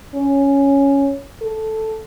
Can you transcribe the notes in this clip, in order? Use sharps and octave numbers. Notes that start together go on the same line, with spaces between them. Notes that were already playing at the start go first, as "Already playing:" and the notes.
C#4
A4